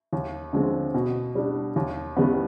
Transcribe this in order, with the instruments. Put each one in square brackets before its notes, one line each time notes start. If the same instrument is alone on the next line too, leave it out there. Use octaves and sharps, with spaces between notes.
[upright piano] D#2
D3 F3 G#3 C4
B2
G3 D4
D#2
D#3 G3 B3